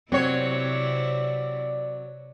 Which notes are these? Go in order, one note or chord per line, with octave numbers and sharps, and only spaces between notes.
C3 F#3 C4 E4 C#5 D5